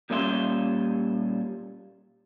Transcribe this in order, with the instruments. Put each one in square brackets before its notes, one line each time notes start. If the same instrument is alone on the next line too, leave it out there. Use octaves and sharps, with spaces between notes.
[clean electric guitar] A#2 G3 C#4 F4 E5 C6